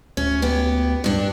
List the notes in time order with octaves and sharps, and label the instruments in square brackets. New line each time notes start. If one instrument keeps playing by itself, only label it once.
[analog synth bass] D2 [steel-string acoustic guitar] C#4
[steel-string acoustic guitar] B3 G4
G2 D4